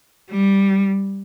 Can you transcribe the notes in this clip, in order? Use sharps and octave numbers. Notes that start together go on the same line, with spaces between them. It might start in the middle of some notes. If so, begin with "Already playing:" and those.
G3